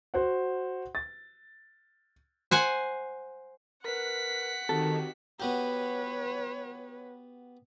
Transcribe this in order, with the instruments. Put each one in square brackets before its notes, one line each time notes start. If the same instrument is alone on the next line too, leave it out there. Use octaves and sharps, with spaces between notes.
[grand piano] F#4 C5 F#5
A6
[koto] C5 F#5 G#5
[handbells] A#4 B4 [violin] F#5 B6
[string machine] D#3 [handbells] C4 F#4 G4 [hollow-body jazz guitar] A4
[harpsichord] B3 F#4 G4 [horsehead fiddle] B4 C#5